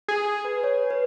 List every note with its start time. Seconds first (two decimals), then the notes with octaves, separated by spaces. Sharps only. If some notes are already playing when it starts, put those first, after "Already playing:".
0.08 G#4
0.45 B4
0.64 C#5
0.90 B4